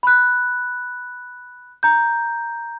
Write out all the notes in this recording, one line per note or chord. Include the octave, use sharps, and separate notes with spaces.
B5 F#6
A#5 G6